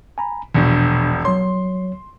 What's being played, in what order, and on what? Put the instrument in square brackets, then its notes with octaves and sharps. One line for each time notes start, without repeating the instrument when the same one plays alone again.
[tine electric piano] G#5 A#5 B5
[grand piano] E1 A#1 [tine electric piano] B2 D4
[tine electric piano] F#3 C#5 [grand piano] C6